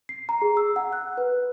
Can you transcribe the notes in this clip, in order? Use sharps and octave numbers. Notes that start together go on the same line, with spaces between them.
C7
A#5
G#4
E6
F#5
F#6
B4